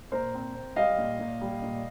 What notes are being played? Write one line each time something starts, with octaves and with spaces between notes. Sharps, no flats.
A#2 A#4 C5
C4
C4
G3 D#5 F5
A#2
A#2
G3
A#2